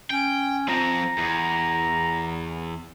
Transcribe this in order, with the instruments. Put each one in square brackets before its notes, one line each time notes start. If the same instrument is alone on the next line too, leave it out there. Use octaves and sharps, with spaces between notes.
[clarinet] C#4 [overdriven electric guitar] G5
[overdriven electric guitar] F3 C4 [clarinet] A#5
[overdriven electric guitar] E2